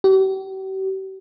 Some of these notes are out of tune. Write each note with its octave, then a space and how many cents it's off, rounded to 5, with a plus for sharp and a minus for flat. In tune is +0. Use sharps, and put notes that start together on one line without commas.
G4 -45